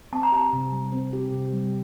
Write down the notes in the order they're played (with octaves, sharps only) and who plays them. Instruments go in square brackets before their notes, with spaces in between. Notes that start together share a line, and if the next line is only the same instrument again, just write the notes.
[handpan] C4 [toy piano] A5
[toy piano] A#5
[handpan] G4 [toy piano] A5
[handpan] C3
G3
C4
G4
C3
G3